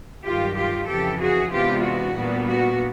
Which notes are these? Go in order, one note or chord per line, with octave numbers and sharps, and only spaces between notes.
G2 D#3 F#3 F4 G4
F4 G4
F2 C#3 E3 G4 A4
F#4 G#4
C3 E3 G#3 B3 D4 F4 G4
F#4
A#2 G3 B3 D4
F#4